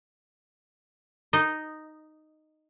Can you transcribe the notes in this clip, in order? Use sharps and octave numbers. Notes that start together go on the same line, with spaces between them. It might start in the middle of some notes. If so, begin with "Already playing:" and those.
D#4 D#5